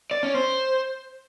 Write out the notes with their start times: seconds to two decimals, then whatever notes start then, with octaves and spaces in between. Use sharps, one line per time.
0.11 D5
0.23 C#4
0.35 C5